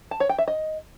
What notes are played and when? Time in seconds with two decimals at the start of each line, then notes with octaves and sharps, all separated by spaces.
0.11 A5
0.20 C#5
0.29 G5
0.38 E5
0.48 D#5